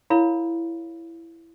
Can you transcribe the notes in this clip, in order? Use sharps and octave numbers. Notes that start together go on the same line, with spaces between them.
E4 A#4 C#5 F5 B5